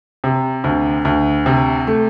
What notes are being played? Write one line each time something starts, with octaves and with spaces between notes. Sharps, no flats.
C3
D2
D2
C3
A3